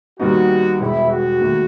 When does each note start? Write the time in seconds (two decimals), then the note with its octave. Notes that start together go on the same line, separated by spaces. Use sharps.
0.19 D#2 D#3 G3 B3 D#4 F#4
0.80 E1 E2 B2 E4
1.11 F#4
1.41 D#2 D#3 A3